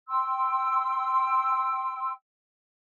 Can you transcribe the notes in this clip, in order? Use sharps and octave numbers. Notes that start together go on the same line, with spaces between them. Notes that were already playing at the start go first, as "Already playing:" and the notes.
G5 C6 E6